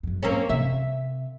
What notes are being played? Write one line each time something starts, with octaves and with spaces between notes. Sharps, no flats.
F#2 F#3
A#3 C4 C#4
C3 E5